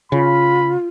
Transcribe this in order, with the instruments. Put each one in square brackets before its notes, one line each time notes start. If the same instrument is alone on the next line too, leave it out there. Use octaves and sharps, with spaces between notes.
[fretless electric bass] C#3 [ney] F4 [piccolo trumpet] B5